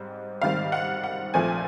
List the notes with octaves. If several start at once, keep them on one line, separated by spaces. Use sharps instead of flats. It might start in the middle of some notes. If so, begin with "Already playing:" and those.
Already playing: G#2 G3 C4
G#2 D#3 G3 C4 F5
F#5
F#5
A#1 A#2 F3 A3 C4 G#5